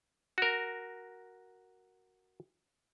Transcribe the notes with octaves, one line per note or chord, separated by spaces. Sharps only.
F#4 A#4